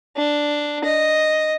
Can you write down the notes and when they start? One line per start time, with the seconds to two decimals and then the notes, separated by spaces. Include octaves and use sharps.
0.17 D4
0.84 D#5